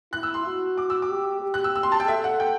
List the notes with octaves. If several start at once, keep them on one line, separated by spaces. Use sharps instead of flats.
E4 F#6
E6
C6
F#4
D6
E6
D6
G4
G4
F#6
E6
E6
C6
A5
G5
A4 E5
F#5
G5